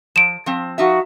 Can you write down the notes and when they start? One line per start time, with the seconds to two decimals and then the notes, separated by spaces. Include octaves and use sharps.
0.16 F3 D7 E7
0.46 F3 C4
0.78 F3 D#4 F#4 E5